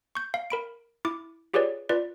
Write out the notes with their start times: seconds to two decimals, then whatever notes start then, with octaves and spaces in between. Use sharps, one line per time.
0.15 C#6 G6
0.34 F5
0.50 A#4 B5 D7
1.05 E4 D6
1.54 F4 G4 G#4 B4 C#5 D5
1.89 F4 B4 D5